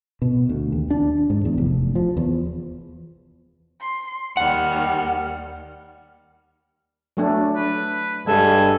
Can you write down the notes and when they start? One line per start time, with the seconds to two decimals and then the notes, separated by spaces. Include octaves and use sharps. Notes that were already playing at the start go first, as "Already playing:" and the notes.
0.22 B2
0.49 D2
0.72 D#2
0.91 D4
1.30 G#2
1.45 E2
1.58 F1
1.95 F3
2.17 E2
3.81 C6
4.37 D#2 G3 F#5 F6
7.17 F#3 A3 D4
7.55 B4
8.27 G2 G#3 A4 G#5